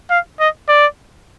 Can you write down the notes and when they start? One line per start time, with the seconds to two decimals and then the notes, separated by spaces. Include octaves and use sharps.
0.10 F5
0.40 D#5
0.69 D5